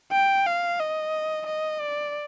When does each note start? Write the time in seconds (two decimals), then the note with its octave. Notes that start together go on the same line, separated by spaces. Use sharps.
0.12 G5
0.46 F5
0.80 D#5
1.47 D#5
1.80 D5